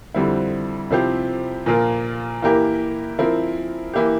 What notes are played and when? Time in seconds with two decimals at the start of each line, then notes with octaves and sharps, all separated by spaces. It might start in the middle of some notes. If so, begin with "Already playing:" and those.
0.14 F2 D3 G3 C4 E4
0.91 C3 F3 C4 E4 G4
1.66 A#2 F3 A#3 F4 A#4
2.42 E3 A#3 E4 G4 A#4
3.19 F3 C4 E4 A#4
3.93 E3 A#3 E4 G4